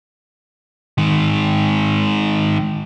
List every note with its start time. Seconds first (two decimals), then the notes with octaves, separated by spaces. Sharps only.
0.98 D#3 G#3